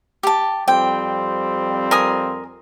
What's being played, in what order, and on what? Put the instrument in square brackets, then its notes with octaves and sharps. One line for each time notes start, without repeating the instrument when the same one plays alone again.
[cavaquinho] G4 A5
[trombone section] F2 G3 C4 [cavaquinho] G5
[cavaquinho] A#4 G#5 D#6